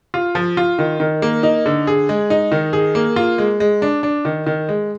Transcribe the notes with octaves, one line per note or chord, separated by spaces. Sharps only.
F4
F3
F4
D#3
D#3
A#3
D#4
D3
G#4
G#3
D#4
D#3
G#4
A#3
F4
G#3
G#3
D4
D4
D#3
D#3
G#3